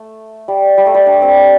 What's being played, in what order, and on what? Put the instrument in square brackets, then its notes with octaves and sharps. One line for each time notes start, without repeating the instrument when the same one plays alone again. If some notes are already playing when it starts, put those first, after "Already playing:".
Already playing: [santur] A3
G3
G3
A3
G3
D4
C4